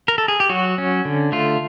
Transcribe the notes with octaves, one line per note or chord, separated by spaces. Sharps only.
A#4
A4
G#4
G4
F#3 F#4
C#4
D3
A3 F4